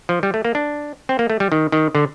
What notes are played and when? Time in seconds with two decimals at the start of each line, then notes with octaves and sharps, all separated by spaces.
0.09 F3
0.23 G3
0.34 A3
0.45 A#3
0.55 D4
1.09 C4
1.19 A#3
1.30 A3
1.40 G3
1.52 D#3
1.72 D#3
1.95 D3